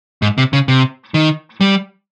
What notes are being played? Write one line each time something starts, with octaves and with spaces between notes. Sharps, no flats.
G#2
C3
C#3
C3
D#3
G3